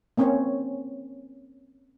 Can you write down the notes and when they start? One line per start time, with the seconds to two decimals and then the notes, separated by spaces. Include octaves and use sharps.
0.18 A#3 C4 C#4 C5 C#5